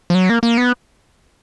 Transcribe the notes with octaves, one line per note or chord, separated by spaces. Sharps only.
F3
F#3
A#3
A#3
B3